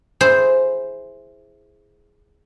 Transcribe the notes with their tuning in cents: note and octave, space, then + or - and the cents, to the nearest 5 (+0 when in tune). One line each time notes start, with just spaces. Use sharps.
E4 +0 G#4 +0 C5 +0